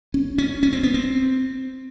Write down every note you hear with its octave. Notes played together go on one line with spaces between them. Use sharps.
C#4
C#4
C#4
C4
B3
C4